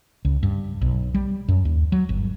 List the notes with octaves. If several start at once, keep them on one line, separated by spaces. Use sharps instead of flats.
C#2
G2
B1
G3
F#2
D#2
F#3
G1